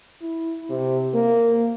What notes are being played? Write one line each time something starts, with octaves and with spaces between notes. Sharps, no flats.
E4
C3
A#3